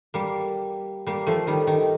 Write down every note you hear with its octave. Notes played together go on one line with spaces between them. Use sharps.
G3 A#3
G3 A#3
F3 A3
D#3 G3
D#3